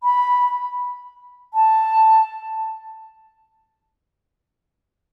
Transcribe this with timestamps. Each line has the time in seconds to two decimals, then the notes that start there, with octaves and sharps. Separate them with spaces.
0.03 B5
1.54 A5